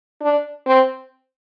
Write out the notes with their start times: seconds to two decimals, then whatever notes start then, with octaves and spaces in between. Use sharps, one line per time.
0.22 D4
0.66 C4